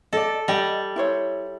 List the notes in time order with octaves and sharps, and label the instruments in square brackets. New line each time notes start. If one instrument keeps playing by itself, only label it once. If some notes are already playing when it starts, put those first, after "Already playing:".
[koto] A4 [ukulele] D5 D#5
[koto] G3 [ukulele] D#5 G5
[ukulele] E4 C5 C#5